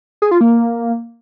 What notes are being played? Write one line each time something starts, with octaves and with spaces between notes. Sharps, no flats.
G#4
F4
A#3